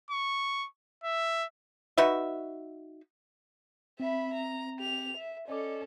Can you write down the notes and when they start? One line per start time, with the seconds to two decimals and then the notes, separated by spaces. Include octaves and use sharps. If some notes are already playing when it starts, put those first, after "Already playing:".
0.11 C#6
1.04 E5
1.98 D#4 F#4 B4 E5
4.00 C4 E5 B5
4.33 A#5
4.79 G4 F7
5.17 E5
5.48 C#4 A4 D5 D#5 D6